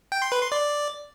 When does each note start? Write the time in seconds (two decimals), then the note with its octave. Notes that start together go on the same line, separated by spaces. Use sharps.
0.12 G5
0.22 C6
0.32 B4
0.42 C6
0.52 D5